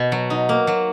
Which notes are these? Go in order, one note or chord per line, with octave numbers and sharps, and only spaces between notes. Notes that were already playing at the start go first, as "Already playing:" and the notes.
Already playing: B2
F#3
D#4
A#3
F#3